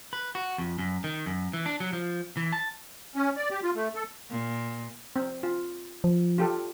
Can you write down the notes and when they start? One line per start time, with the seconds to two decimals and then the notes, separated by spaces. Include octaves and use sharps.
0.13 B4
0.35 F#4
0.58 F2
0.79 F#2
1.04 D#3
1.26 F#2
1.53 E3
1.66 D4
1.80 F#3
1.93 F3
2.37 E3
2.52 A5
3.16 C#4
3.36 D5
3.51 G4
3.63 F4
3.75 A3
3.95 A4
4.30 A#2
5.16 C4
5.43 F4
6.04 F3
6.38 F4 G4 A4